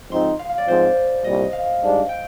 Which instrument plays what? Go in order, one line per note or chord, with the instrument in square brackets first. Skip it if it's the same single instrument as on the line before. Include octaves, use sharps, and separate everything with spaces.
[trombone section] G#2 F3 C4 D#4 [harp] C6
[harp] F5
F5
D5
[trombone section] G#2 F3 C4 [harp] C5
[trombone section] C2 A#2 G3 [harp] D#5
[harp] F5
[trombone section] G#2 G3 D4
[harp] G5